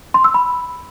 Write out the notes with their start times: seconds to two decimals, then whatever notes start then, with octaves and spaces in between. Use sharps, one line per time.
0.14 C6
0.24 E6
0.34 B5